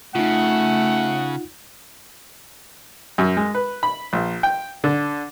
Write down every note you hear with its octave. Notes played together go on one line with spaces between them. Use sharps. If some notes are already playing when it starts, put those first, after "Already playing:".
C#3 A3 D#4 F4 F#5
F#2
G#3
B4
B5
A#1
G5
D3